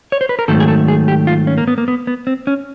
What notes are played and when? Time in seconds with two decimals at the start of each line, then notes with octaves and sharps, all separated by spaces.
0.12 C#5
0.21 C5
0.29 B4
0.39 A#4
0.48 G#2 D#3 F#3 A3 A4
0.60 G#4
0.68 A4
0.88 G#4
1.08 G4
1.27 F4
1.47 C#4
1.58 A#3
1.68 B3
1.78 A#3
1.88 B3
2.07 B3
2.27 C4
2.47 C#4